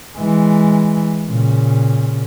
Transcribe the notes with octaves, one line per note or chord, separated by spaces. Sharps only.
E3 G#3
A#2 C#3